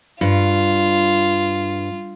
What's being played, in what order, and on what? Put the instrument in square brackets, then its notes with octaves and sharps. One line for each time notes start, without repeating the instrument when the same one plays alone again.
[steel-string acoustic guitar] G2 [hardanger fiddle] F4